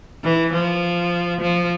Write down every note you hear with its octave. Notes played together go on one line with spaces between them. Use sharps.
E3
F3
F3